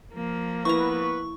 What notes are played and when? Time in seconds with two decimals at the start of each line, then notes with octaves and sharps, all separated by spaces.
0.14 F3 A#3
0.65 B3 E4 B4 A#5 C#6